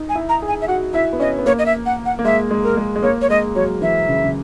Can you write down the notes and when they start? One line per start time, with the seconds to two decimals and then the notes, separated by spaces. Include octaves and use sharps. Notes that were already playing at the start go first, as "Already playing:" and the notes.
Already playing: D#4
0.09 G#5
0.15 E4
0.29 A#5
0.42 G#4
0.48 G#5
0.62 E5
0.68 F#4 F#5
0.93 E4 E5
1.13 B3
1.20 C#4 D#5
1.38 B3
1.46 A#3 C#5
1.59 D#5
1.66 E5
1.86 F#5
2.06 F#5
2.19 A#3
2.25 G#3 E5
2.51 G#3
2.63 A#4
2.77 G#3
2.96 G#3
3.03 A#3 C#5
3.22 C#5
3.30 G#3 D#5
3.55 F#3 C#5
3.81 E3 E5
4.08 C#3
4.24 C#3